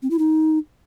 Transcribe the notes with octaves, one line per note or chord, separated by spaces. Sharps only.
C4
E4
D#4